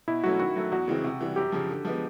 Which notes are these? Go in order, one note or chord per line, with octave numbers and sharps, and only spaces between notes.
B2 E4
F#3 A3 C#4 F#4
D#3 F#4
F#3 A3
E2 F#4
C#3 E3 G#3 C4
C3
E3 G3
F#2 G4
C#3 F3
D3
F3 G#3 B3